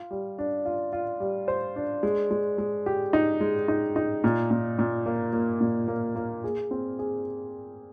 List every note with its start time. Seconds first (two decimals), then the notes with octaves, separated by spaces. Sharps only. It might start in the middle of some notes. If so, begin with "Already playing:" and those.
Already playing: F4
0.11 G3
0.39 D4
0.65 F4
0.93 F4
1.20 G3
1.48 C5
1.76 D4
2.03 G#3
2.31 G#3
2.58 G#3
2.86 G4
3.13 D#4
3.41 G#3
3.68 D#4
3.96 D#4
4.24 A#2
4.51 A#2
4.79 A#2
5.06 A#3
5.33 A#3
5.61 A#2
5.88 A#3
6.16 A#3
6.44 G#4
6.71 C4
6.99 G#4